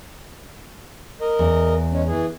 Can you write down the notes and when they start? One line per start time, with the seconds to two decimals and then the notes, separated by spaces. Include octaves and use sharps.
1.21 A#4 D#5
1.39 E2
1.93 G#3 C#4
2.07 E3 G#4